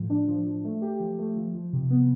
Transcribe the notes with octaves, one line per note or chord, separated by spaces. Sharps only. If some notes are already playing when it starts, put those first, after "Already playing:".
Already playing: A2 F3
D4
F3
F3
A3
G4
F3
A3
F3
F3
C3
B3